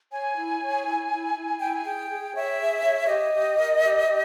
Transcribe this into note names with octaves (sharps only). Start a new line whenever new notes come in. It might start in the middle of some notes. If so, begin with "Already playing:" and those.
C#5 G#5
E4
C#5
E4
E4
E4
E4 G5
G#5
G#4 G5
G#4
C#5 E5
G#4
C#5
C#5
G4 D#5
G4
A#4
G4
G4